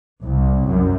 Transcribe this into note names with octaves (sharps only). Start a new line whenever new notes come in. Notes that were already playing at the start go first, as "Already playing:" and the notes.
C2
F#2